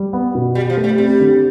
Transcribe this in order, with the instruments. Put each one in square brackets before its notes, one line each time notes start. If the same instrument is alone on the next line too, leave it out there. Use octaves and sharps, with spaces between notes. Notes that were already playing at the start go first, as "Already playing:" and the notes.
Already playing: [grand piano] G3
B3
B2
[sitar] G3 [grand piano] G4
[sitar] F3
[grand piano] A3
[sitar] G3
[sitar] G3 [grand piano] C4
[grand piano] D3